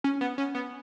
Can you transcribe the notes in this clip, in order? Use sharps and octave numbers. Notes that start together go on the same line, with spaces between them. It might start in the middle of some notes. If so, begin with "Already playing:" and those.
C#4
B3
C#4
B3